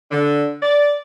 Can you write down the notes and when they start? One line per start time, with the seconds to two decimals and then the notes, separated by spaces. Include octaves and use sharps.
0.11 D3
0.63 D5